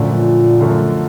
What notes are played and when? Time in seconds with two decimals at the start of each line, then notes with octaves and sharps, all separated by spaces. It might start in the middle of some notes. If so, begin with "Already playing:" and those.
Already playing: F#2 A#2 D3 F3 A3
0.60 F#2 D3 F3 A3